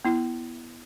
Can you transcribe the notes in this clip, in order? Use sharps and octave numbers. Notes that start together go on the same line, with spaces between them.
B3 E4